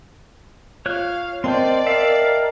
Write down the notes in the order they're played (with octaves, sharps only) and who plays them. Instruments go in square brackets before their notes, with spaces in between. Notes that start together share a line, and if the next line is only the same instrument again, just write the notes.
[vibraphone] F4 [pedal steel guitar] C#5 F#6 [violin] F5
[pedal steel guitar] C4 A#4 C5 [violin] D5 [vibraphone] D#5 G5 A5
[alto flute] A#4 [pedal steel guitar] E5 F5